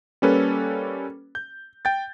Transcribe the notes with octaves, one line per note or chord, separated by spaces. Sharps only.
G3 A#3 C#4 A4 B4
G6
G5 G6 A6